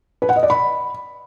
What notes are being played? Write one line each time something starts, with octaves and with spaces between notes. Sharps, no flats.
B4
F#5
D#5
D5
B5